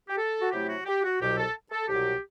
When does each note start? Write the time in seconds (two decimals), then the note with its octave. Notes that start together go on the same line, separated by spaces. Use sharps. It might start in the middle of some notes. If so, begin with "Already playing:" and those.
0.09 G4
0.17 A4
0.41 F#4
0.52 C3 F#3 A3 E4 G4
0.69 F#4
0.86 G4
1.03 F#4
1.20 C2 B2 F#3 G4
1.37 A4
1.72 A4
1.89 C2 B2 F#3 G4